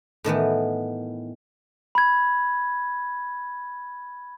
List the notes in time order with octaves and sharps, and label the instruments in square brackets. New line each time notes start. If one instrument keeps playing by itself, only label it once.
[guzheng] A2 D#3 E3 B3
[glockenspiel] B5 G#6